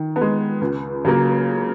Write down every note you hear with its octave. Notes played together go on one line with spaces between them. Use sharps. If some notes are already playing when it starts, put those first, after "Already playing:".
Already playing: D#3
B3
G#3
C#2
C#3 F#3 A#3